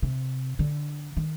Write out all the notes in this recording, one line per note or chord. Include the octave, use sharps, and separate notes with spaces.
C3
D3
D#3